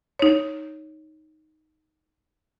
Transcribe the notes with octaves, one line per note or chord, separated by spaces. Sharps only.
D#4 C#5